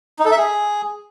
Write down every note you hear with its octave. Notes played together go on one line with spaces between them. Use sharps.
D#4
A4
E5
G#4